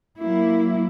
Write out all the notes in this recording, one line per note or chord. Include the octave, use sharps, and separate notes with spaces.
F#3 A#3 E4